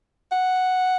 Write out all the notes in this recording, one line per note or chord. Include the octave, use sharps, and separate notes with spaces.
F#5